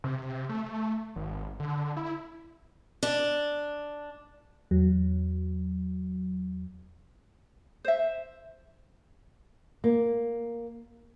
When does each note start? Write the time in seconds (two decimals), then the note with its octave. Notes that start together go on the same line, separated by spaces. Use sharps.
0.04 C3
0.49 A3
1.16 G#1
1.60 D3
1.97 E4
3.03 D4
4.71 E2 F#3
7.85 C5 E5
9.84 A#3